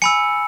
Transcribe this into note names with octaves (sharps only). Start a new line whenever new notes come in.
G#5 B5 E6 C#7